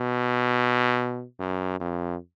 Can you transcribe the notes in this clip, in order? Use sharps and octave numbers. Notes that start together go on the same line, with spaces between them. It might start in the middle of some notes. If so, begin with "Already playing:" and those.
Already playing: B2
F#2
F2